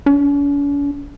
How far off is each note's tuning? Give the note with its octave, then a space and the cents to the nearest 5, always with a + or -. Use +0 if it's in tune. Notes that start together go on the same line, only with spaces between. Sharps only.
C#4 +45